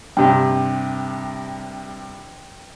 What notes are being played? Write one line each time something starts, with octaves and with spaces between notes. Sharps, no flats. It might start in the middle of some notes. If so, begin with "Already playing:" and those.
G2 C3 G5